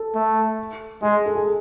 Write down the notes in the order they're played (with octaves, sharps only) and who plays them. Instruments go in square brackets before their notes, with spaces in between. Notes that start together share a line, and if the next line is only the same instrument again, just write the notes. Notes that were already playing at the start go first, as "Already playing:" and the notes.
Already playing: [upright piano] A4
[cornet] A3
[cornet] G#3 [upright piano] G#4
[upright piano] A4
G#4